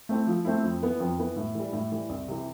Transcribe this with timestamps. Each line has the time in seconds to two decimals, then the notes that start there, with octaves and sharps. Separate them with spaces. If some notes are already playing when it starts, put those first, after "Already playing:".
0.09 A3 C4 E4
0.27 F3
0.45 A3 C4 E4
0.63 F2
0.82 E3 B3
1.00 F2
1.19 E3 B3
1.36 A2
1.55 E3 G3
1.73 A2
1.92 E3 G3
2.09 C2
2.28 C3 E3